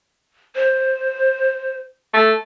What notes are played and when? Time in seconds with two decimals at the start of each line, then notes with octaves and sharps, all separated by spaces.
0.55 C5
2.14 A3